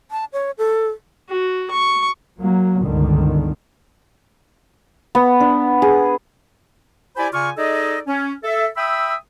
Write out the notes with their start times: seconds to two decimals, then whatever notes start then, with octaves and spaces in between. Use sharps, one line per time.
0.11 A5
0.33 C#5
0.58 A4
1.29 F#4
1.71 C#6
2.38 F#3 A#3
2.82 G1 C#2 D3 D#3
5.15 B3
5.40 D4
5.82 G#4
7.17 E4 G4 C5 D5 G#5 B5
7.33 C#3 F4 D5 G#5 C#6 F6
7.57 D#4 G#4 A4 D5 D#5
8.07 C#4
8.44 A4 E5
8.77 E5 G5 B5 D#6 E6